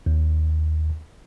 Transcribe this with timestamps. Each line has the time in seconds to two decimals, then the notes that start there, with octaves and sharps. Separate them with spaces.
0.06 D#2